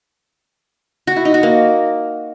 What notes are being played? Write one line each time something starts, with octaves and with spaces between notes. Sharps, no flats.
F#4
E4
D#4
F#4
A#3